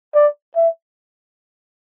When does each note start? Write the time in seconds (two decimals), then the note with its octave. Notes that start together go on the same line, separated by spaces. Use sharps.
0.15 D5
0.56 E5